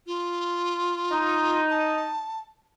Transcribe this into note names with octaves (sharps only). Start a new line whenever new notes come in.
F4
D#4
A5